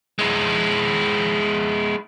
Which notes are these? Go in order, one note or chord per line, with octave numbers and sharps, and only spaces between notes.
G#3 E4